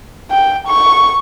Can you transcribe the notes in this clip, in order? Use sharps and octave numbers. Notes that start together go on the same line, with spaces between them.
G5
C#6